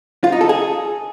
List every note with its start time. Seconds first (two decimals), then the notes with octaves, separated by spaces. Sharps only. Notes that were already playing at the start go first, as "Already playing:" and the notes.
0.24 F4
0.32 D#4
0.41 A4
0.49 G#4